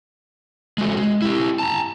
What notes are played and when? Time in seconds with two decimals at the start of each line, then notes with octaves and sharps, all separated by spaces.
0.78 G#3 A3 F#4
0.97 G#3
1.22 E4 G4
1.59 A5 A#5